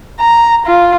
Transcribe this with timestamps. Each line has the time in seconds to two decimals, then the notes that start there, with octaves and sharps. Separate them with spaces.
0.20 A#5
0.66 F4